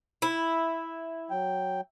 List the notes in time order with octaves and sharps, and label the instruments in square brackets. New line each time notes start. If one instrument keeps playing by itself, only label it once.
[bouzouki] E4
[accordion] F#3 G5